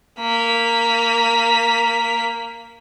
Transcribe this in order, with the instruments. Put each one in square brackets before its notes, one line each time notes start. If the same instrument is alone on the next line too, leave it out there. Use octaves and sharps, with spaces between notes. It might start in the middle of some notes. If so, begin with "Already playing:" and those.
[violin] A#3 B6